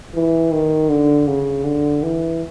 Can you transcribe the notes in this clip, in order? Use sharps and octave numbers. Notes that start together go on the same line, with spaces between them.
E3
D#3
D3
C#3
D3
E3